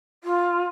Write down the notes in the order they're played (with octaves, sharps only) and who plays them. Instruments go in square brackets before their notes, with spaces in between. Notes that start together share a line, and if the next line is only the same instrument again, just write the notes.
[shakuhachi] F4